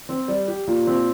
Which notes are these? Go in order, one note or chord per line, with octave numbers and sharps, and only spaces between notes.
C4
G3
G4
A#2
C4